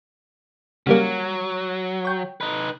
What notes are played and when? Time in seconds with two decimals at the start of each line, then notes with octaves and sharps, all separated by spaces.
0.87 C#3 F#3 G3 A#3
2.05 C#5 G5
2.41 D#4 B4